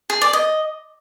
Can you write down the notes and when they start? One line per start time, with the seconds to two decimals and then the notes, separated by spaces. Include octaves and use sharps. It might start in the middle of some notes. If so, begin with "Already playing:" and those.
0.10 G#4
0.21 D5
0.33 D#5